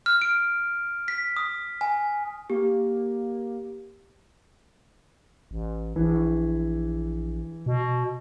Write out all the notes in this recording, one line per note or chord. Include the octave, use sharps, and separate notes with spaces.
F6
D7
B6
D#6
G#5
A#3 G4
A1
A#1 E3
B2